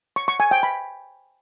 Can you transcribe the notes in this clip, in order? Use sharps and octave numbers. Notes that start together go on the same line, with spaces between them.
C#6
C#6
G#5
G5
B5